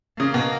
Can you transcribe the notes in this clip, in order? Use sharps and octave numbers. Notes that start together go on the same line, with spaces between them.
C#3 A#3
B2